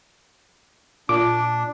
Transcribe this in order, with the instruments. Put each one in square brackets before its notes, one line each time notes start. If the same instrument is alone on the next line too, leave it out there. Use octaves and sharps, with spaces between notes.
[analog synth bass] A#2 [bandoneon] D4 [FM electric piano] D6